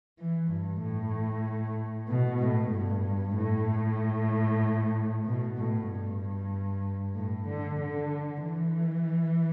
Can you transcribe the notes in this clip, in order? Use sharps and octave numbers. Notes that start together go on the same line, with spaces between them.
E3
G2
A2
B2
A2
G2
A2
B2
A2
G2
A2
D3
D3
E3